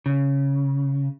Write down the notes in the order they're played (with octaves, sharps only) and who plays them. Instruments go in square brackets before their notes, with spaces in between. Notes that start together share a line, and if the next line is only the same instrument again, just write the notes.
[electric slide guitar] C#3